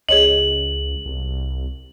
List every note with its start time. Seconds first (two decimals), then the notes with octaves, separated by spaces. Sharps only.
0.09 C#2 G#4 C#5 D#5 F#7
1.06 C2